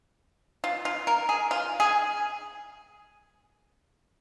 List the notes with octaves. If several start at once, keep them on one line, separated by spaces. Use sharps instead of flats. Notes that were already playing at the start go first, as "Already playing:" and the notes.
F4
F4
A#4
G#4
F4
G#4